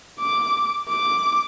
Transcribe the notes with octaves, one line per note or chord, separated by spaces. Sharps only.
D6
D6